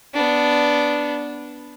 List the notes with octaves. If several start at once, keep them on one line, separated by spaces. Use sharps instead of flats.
B3 D4